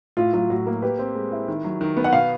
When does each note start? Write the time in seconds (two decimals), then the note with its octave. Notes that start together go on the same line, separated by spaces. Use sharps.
0.17 A2 F4
0.33 F#3 F4
0.50 A2 F#4
0.66 A#3 A#4
0.82 G4 B4
0.99 C4
1.15 G#3
1.32 E4
1.48 D#3
1.64 F#3
1.81 D#3
1.97 B3
2.04 F#5
2.13 B2 F5